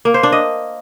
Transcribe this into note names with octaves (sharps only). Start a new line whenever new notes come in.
A#3
C5
D4
D#5